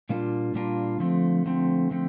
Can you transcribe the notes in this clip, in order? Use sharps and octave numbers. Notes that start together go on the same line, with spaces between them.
A#2 G3 A#3 D4 F4
A#2 G3 A#3 D4 F4
D3 F3 A3 C4
D3 F3 A3 C4
D3 F3 A3 C4